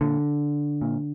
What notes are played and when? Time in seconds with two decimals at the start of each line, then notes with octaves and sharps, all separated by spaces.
0.01 A#2 D3
0.81 A#2